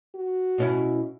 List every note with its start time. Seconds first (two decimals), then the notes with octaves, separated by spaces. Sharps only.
0.16 F#4
0.58 B2 C#4 E4